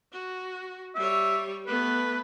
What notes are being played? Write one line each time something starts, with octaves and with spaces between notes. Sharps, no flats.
F#4
G3 C#5 E5
A3 B3 B4